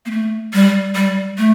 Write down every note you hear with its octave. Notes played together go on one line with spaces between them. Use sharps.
A#3
A3
G3
G3
A3